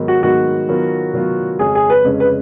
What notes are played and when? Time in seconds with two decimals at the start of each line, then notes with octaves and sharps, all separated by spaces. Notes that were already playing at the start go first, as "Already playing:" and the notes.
Already playing: G#2 D#3 F#3 B3
0.08 F#4
0.23 G#2 D#3 F#3 B3 F#4
0.68 D#3 F#3 B3 F4
1.14 D#3 F#3 B3 F4
1.59 F2 C#3 G#3 C#4 G#4
1.75 G#4
1.90 B4
2.04 F2 C#3 G#3 C#4
2.20 B4